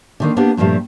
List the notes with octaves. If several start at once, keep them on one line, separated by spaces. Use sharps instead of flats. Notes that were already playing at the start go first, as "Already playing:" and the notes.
D3 D#3 A#3
A#3 B3 D4 G4
G2 A#2 F3 A3 G4 A5